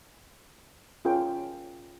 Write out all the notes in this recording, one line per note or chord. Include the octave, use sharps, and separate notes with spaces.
C#4 F4 G#4 A#4 G5